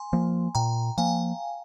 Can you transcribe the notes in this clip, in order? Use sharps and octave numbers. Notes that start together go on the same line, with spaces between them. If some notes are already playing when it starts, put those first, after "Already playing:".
Already playing: G#5 C6
F3 A#3
A#2 G5 A#5
F3 A#3 F5 G#5